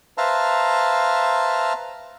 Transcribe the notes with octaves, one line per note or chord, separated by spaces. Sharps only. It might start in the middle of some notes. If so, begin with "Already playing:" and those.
B4 C5 E5 F5 A5 A#5